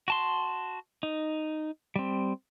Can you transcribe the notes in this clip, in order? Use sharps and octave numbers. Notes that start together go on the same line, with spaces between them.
F#4 A5 C6
D#4
G3 C4